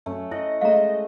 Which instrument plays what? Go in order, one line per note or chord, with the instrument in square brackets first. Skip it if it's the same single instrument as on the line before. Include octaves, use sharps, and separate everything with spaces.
[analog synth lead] F#2 [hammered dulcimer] A3 C#4
[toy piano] E4 [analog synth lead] D#5 [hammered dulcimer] F#5
[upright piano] G#3 A3 [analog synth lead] D#5 [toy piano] F5 A#5